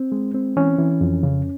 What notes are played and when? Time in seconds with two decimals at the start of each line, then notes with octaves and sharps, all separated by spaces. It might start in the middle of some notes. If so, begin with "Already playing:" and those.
Already playing: C4
0.12 G#3
0.34 C4
0.57 E3 C#4
0.79 E3
1.01 F2
1.23 C#3